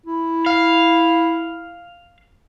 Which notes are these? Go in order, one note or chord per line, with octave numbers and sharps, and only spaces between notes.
E4
F5